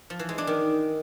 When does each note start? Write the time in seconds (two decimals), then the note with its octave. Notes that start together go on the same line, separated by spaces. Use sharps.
0.10 F3
0.19 E3
0.29 G#3
0.38 D4
0.47 D#3